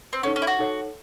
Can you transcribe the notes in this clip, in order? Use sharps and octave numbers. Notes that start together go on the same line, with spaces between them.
C4
C#4 D#4 A4 C#5 F#5
C#4
E4
F#4
D#4 A4 C#5 F#5